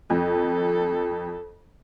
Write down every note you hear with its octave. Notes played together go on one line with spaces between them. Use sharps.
F2 A4